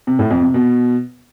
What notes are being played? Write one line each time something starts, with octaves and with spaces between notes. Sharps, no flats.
C3
A2
F2
C3
B2